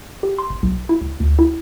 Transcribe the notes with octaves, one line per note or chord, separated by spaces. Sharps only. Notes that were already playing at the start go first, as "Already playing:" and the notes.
G4
C6
G1
B1
E4
C#2
D2
E4